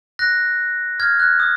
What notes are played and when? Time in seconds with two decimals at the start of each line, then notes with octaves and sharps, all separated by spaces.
0.19 F#6 A#6
1.00 F6 G#6
1.20 F#6
1.40 D#6